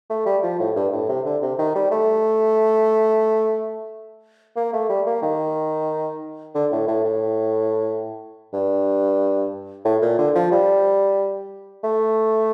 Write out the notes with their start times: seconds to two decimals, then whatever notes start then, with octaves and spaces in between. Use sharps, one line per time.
0.10 A3
0.26 G3
0.43 F3
0.59 A2
0.76 G2
0.93 A2
1.09 C3
1.26 D3
1.42 C3
1.59 D#3
1.75 G3
1.91 A3
4.56 A#3
4.73 A3
4.89 G3
5.06 A#3
5.22 D#3
6.55 D3
6.72 A2
6.88 A2
7.05 A2
8.53 G2
9.85 A2
10.02 A#2
10.18 D3
10.35 F3
10.51 G3
11.84 A3